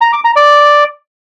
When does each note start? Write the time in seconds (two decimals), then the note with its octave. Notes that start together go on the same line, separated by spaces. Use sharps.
0.01 A#5
0.13 D6
0.24 A#5
0.36 D5